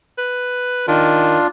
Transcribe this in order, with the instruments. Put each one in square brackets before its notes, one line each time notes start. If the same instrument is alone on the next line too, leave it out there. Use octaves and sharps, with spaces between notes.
[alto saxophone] B4
[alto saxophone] D#3 [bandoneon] D4 F4